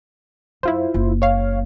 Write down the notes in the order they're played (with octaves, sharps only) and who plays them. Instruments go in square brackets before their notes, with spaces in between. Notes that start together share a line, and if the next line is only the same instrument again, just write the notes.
[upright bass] F#2 [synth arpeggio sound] E4 F4 C5
[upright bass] F#1
[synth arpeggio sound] C#5 F5